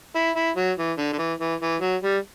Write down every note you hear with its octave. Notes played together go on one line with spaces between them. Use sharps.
E4
E4
F#3
E3
D3
D3
E3
E3
E3
F#3
G3